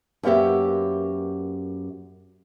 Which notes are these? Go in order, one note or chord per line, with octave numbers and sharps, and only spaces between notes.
F#2 A#3 B3 G4 E5